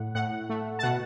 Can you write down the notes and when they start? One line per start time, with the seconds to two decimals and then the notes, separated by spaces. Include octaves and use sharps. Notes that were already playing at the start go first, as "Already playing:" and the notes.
Already playing: A2 F#5
0.15 A2 F#5
0.50 A3
0.79 A5
0.83 B2 F#5